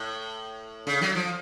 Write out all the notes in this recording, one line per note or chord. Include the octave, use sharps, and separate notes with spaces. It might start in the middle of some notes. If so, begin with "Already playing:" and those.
Already playing: A2
C#3
F#3
F3